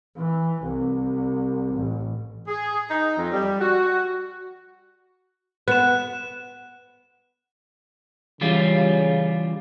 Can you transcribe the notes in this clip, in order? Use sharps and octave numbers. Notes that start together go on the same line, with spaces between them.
E3
C2
A1
G#4
D#4
F2
G3
F#4
B3 F#6 E7
C#3 E3 G3 F4